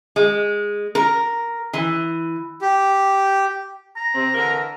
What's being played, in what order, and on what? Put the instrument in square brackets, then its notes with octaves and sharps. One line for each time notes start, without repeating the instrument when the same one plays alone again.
[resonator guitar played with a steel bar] G#3
A#4
E3
[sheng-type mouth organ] G4
[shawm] A#5
[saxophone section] C3 C4
D3 E3 A#4